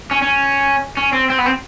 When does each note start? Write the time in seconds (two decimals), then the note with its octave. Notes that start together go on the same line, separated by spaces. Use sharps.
0.11 C#4
0.22 C#4
0.97 C#4
1.13 C4
1.30 C4
1.38 B3
1.46 C4